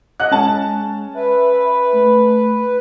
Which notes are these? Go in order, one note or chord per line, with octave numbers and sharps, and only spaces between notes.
D#5 F#5 F#6
G#3 C#4 A5
B4 E5
A3